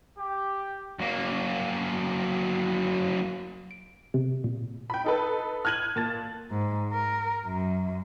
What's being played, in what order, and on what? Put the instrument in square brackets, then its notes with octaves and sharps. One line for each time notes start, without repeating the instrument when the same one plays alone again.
[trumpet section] G4
[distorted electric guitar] F#3 A#3
[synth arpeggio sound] D7
C3
A#2
[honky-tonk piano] G5 B5
D#4 A4 B4
F6 F#6 G#6 D#7 F#7
A#2 A5 A6
[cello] G#2
A#4
F#2